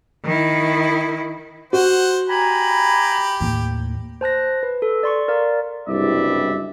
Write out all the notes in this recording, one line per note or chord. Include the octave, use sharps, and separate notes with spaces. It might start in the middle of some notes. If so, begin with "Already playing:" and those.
D#3 E4
F#4 C5 F#5
G4 G#5 A#5 B5
D#2 A2
C5 A5 F#6 A#6
B4
A4
D5 C6 C#6
A#4 D5 F5
F#1 C2 G2 G#3 D5 E5